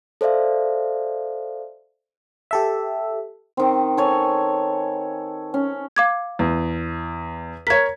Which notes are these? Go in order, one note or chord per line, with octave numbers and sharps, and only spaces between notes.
A4 C5 D5 E5 F5
G4 A4 E5
D#3 C4
A4 C#5 G#5
C#4
F5 D6 G#6
E2
A#4 C#5 G#6 B6